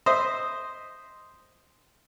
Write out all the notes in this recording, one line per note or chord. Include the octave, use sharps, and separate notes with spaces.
C5 D#5 E5